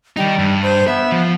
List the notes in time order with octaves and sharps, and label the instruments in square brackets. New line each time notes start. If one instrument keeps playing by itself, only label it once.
[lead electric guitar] D#3 D#4 [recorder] G3
[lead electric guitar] G2
[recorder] C5
[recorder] B3 [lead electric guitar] E5
[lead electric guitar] F3